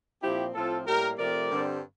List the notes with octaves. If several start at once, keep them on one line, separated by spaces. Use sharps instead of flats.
A#2 F3 C4 E4 G4
A2 F3 C4 F4 A4
A2 G3 A#3 G4 A#4
C3 F3 A3 C4 A#4 D5
G2 D3 G3 C4